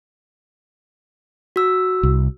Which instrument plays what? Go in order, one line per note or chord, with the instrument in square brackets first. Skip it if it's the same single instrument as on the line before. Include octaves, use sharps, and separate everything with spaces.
[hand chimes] F#4 E6
[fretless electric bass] C2